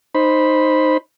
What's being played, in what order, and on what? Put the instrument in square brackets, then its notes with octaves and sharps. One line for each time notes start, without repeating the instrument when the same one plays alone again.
[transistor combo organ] D#4 C5 B5